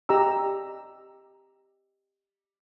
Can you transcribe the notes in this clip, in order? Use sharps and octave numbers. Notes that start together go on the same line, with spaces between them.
G4 D#5 A#5 E6